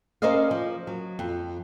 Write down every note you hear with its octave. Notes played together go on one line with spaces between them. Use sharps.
C#4 A#4 C5 D5 D#5 F5
F3
F#3
F2